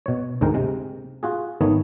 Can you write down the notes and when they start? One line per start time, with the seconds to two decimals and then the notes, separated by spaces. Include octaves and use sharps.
0.06 B2 C#5
0.41 D2 G#2 G#3 A#4 G5
0.54 C3 G#3
1.23 F4 F#4 G#4
1.61 G#1 D#3 A3 B3 C#5 D#5